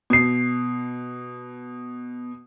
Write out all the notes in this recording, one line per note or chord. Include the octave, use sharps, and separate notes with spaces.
B2 C7